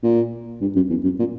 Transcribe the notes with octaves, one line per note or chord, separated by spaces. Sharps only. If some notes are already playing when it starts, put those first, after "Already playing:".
A#2
G2
F#2
E2
F#2
A#2